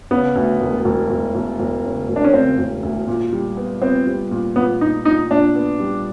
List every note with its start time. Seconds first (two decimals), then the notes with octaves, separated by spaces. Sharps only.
0.11 C#3 B3
0.36 D2
0.60 E1
0.85 E1
1.10 E1
1.35 E1
1.59 E1
1.84 C#3
2.09 E1
2.16 D4
2.24 C#4
2.33 C#3 C4
2.58 E1
2.83 D2
3.07 A#2
3.32 G3
3.57 B3
3.82 B3 C4
4.06 G3
4.31 A#2
4.56 A#2 B3
4.81 A#2 D#4
5.05 A#2 D#4
5.30 A#2 D4
5.55 B3
5.80 G3